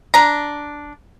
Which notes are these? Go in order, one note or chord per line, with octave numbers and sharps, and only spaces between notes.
D4 A#5